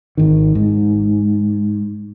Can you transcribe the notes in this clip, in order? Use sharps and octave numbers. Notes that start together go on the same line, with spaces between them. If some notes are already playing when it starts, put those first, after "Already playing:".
G#1 D#3
G#2